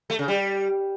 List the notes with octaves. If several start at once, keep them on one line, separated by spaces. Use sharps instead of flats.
A3
C#3
G3